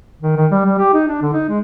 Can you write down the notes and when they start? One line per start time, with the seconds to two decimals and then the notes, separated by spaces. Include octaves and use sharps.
0.22 D#3
0.37 D#3
0.51 G3
0.65 G3
0.78 G4
0.94 D#4
1.08 D4
1.22 D3
1.33 D#4
1.49 G#3